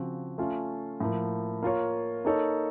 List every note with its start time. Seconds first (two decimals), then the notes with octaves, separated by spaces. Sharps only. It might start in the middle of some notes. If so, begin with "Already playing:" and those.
Already playing: C#3 F3 C4 F#4
0.38 A3 C#4 F4
1.00 A2 F3 A#3
1.63 A#3 F4 A#4 C#5
2.25 A#3 D#4 A4 C#5